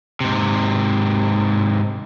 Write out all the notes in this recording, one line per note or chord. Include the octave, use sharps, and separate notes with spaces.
G#2 C3